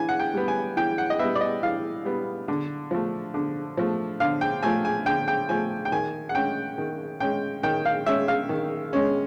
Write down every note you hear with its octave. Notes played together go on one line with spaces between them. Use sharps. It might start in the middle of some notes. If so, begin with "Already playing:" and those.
Already playing: E3 G#5
F#5
G5
G3 B3
G#5
E3 G5
F#5
D#5
G3 B3 E5
D5
D#5
E3 F5
G3 B3
D3
F3 A3
D3
F3 A3
D3 F5
G5
F3 A3 G#5
G#5
D3 G5
G5
F3 A3 G#5
G5
D#3 G#5
F#5
G#3 C#4 G5
D#3
G#3 C#4 G5
D#3 G5
F5
G#3 C#4 E5
F5
D#3
G#3 C#4